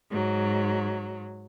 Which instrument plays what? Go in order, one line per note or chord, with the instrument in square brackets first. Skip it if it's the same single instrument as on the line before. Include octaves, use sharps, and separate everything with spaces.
[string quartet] G#2 F#3